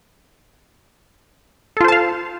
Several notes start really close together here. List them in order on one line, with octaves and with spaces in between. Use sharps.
A4 F4 C5 A5 F5